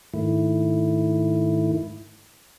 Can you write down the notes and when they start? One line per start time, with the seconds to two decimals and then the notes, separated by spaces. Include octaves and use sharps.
0.14 G#2 D#3 A3 E4